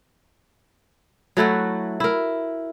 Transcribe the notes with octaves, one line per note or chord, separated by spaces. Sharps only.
F#3 A3 E4 F#4
E4 A#4